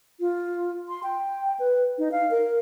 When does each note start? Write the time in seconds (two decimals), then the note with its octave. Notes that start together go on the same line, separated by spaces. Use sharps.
0.20 F4
0.88 C6
1.03 G5
1.60 B4
1.98 D#4
2.12 F5
2.31 A#4